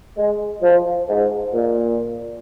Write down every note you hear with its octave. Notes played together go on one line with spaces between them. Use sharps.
G#3
F3
G#2
A#2